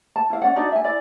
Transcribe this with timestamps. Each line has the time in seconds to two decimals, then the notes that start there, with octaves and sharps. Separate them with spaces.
0.16 A5
0.30 E4 F5
0.42 C#4 D5 F#5
0.56 D4 D#4 F#4 D5
0.72 E5 G#5
0.84 E4 D5